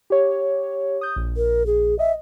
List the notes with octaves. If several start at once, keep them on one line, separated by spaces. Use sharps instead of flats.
G4 C#5
D#6 G6
A#1
A#4
G#4
D#5 E5